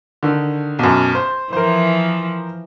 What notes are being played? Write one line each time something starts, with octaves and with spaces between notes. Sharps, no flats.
D3 D#3
B1 F#2
C5
E3 F3 A#4 C5